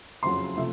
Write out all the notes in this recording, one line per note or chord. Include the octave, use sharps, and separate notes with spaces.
F#1 F2 C#3 F#3 C6
C3 F3 A3